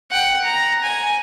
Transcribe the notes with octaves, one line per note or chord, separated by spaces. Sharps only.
F#5 G5
A#5
G#5